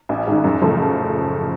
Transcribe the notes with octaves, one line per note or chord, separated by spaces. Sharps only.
A1
G#2 D#3
F#2
C#3 F3 A3